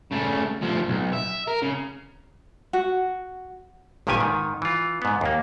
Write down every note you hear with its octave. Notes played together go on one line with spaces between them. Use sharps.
C#3 A3
D2 F3
B1
E5
A#4
C#3
F#4
G1 G2 A#2 D#3 G4 G#5
G#2 D#3
E3 F4
G#2 B3
D#2 A#3